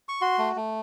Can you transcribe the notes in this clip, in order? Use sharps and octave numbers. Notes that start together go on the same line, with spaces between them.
C#6
F#4 C6
A3
A3